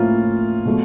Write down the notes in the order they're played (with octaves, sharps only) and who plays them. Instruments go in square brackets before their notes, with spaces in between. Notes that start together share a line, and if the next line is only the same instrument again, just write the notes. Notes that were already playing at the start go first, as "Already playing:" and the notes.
Already playing: [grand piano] A2 F3 A#3 C#4 E4 [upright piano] F4
[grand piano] B2 F#3 A3